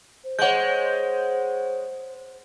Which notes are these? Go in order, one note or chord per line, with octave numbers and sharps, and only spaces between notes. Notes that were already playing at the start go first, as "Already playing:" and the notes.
C5
G#3 C#5 F#5 G6